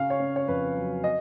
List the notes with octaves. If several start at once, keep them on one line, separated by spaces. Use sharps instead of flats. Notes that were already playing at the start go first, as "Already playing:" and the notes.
Already playing: C#3 F5
C#5
C#4
C#5
F2 B4
F#3
D#5